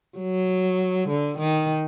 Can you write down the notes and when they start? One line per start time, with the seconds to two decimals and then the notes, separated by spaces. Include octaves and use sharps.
0.18 F#3
1.09 D3
1.38 D#3